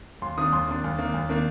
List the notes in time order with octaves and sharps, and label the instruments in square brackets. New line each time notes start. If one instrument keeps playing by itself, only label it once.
[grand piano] D#2 C6
D#3 A#3 D4 D#6
D#2 C6
D#3 A#3 D4
D#2
D#3 A#3 D4
D#2
D#3 A#3 D4